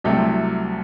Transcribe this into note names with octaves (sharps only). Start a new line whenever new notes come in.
C2 C3 F#3 A3 G5